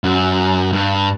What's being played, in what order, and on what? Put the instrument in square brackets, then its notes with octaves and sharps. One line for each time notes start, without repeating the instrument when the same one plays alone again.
[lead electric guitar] F#2
G2